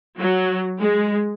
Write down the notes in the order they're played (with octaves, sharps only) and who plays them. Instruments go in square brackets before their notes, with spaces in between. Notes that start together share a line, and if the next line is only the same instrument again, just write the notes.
[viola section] F#3
G#3